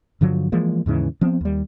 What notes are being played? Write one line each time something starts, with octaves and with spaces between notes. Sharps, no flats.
G2 D3 F3 F#3
E3 F3 G#3 A#3
D#2 G#2 C#3 E3
F3 B3 C4
D#2 G3